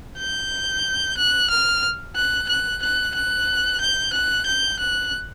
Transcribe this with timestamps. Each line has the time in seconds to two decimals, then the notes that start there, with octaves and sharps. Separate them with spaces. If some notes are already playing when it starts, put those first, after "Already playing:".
0.19 G6
1.17 F#6
1.50 F6
2.16 F#6
2.49 F#6
2.82 F#6
3.15 F#6
3.80 G6
4.13 F#6
4.46 G6
4.79 F#6